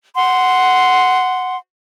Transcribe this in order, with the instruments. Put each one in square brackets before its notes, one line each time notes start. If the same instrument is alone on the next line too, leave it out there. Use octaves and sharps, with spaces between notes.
[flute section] F#5 C6